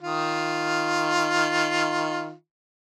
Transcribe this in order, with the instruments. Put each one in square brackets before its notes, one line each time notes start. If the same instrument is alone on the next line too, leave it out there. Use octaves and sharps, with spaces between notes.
[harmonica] D#3 F4